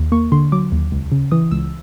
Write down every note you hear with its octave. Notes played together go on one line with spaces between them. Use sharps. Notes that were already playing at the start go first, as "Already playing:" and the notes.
Already playing: D#2
A#3 C#6
D3 C6
F#3 D6
D#2
C#2
C#3
E3 D#6
C#2 E6